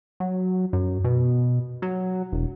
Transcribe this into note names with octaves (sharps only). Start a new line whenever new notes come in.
F#3
F#2
B2
F#3
E1